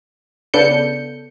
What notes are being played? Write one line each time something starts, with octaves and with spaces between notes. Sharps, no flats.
C#3 B3 D4 A4 G6 C#7